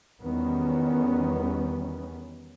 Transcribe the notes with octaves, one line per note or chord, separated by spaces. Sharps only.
E2 D#3 G3 B3 C#4